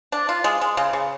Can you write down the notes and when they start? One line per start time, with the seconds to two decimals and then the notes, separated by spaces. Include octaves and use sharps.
0.12 D4
0.29 F4
0.44 G#3
0.61 G#3
0.77 C#3
0.93 C#3